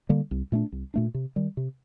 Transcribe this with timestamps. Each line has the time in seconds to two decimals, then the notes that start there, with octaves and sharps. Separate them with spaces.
0.09 D3 G3 A#3
0.31 C2
0.52 A#2 A3 D4
0.72 C2
0.94 A#2 A3 D4
1.14 C3
1.36 D#3 G3
1.57 C3